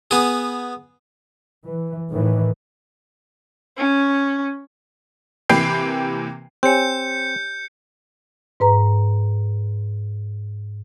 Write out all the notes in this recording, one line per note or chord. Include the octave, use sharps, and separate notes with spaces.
B3 G#4
E3
A2 D#3 E3
C#4
C3 E3 A#3 B4 G5 C7
C4 G4 C#5 G#5 G6 C#7
G#2 B4 A#5